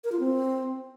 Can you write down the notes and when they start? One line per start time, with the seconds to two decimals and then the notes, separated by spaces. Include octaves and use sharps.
0.04 A#4
0.12 F4
0.20 C4